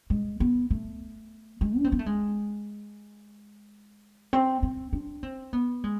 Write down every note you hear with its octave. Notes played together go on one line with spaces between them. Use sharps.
G#3
B3
A3
G#3
D4
C4
B3
A3
G#3
C4
C4
D4
C4
B3
G#3